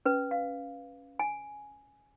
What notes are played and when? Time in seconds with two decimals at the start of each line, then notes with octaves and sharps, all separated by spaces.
0.05 C#4 B4
0.31 F5
1.19 G#5